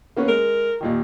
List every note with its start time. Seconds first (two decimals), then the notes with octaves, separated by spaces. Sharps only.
0.17 A#3 B3 C#4
0.28 G#3 A#4
0.81 D#2 A#2 D#3